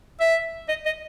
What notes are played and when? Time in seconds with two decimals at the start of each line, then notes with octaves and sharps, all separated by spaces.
0.20 E5
0.68 D#5
0.85 D#5